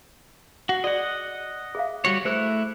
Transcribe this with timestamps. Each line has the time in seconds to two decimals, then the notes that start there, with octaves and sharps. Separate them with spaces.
0.69 F#4 F#5
0.84 F#4 G#4 D5 D#5 F#5
1.75 G#4 E5 F5
2.05 G3 F#4 C#5
2.25 A3 E4 G#4 C5 F#6